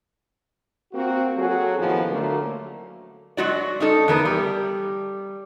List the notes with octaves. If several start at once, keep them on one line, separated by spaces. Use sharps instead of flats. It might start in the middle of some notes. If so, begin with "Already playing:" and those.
A#3 C4 F#4
F#3 F4 F#4 G#4 A4
D#2 A2 F3 B3 C#4
D3 F#3 A3 A#3 A#4
F#3 G#3 F#4 D5
C#4 D#4 A4
E2 A3 B3 A#4
G3